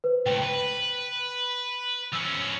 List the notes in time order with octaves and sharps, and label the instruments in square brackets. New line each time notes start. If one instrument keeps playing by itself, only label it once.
[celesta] B4 C5
[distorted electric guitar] C#2 A2 [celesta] G5
[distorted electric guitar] B4
[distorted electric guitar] F3 C#4 [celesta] E6